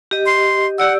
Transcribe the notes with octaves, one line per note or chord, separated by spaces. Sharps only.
G4 D#5
C6
G4 D5 F#5 E6